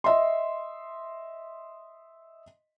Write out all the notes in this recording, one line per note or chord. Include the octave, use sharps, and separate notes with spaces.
D#5 E5 C6